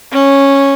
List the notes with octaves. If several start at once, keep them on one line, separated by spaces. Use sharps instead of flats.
C#4